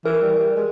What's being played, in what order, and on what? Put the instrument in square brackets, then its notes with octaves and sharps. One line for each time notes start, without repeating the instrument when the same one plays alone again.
[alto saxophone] E3 [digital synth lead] A#4
[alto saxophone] G3
G3
G#3